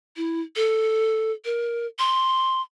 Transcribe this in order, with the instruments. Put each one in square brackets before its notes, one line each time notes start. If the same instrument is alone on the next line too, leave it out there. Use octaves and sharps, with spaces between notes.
[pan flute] E4
A4
A#4
C6